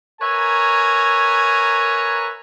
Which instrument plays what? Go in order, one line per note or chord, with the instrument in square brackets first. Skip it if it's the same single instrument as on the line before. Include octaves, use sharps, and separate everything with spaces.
[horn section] A#4 B4 C#5 E5 G#5 A#5